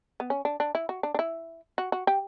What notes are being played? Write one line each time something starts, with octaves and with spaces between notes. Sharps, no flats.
B3
C#4
D4
D4
E4
F#4
D4
D4
E4
F#4
F#4
G4